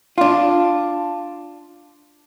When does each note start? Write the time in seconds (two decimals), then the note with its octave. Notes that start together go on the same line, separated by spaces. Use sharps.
0.18 D4 F4